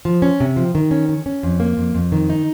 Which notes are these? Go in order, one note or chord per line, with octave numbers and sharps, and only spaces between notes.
F3
C#4
C3
F3
D#3
C#4
C#4
C#4
F2
A#3
F2
F2
D#3
D#4